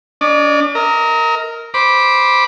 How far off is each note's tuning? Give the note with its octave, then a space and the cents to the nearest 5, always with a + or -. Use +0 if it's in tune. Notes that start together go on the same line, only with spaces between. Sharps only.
D4 -45 D5 +40
A#4 -10 D#5 +35
C5 +0 B5 -10 D6 +0